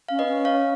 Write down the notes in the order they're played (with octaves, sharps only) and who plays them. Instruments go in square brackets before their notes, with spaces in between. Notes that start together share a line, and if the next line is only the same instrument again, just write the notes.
[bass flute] C#4 [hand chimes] F5
[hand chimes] B4 D#5
[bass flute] C#4
[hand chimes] C#5 F5